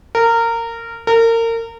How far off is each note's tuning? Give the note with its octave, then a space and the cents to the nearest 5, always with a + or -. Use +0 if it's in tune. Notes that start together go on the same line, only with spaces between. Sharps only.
A#4 -20
A#4 -30